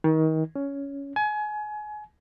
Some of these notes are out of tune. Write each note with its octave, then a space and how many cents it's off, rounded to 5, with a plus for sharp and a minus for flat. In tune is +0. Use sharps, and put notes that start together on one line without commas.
D#3 +30
C#4 +10
G#5 +30